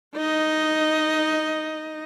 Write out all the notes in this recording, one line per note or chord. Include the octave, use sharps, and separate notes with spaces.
D#4 D#5